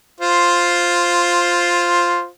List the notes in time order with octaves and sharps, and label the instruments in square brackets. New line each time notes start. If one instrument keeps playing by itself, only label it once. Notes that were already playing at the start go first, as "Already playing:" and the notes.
[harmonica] F4 C5